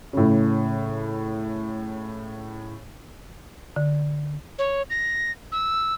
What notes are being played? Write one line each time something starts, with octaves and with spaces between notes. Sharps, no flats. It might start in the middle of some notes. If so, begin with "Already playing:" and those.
A2 C#3
D3
C#5
A#6
E6